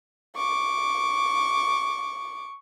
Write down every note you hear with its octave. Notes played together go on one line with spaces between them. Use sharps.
C#6 D6